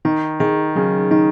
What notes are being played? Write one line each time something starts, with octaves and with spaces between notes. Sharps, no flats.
D#3 D#4
D#3 G#4
C#3 F#3
D#3 D#4